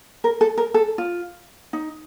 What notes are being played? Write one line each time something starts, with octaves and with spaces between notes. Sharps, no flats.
A#4
A4
A#4
A4
F4
D#4